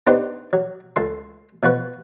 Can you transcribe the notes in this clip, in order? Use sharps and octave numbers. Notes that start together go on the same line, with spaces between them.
B3 D4 D#4 G4 B4 C5
F#3
C#2 A4 C6
B2 F3 F#4 B4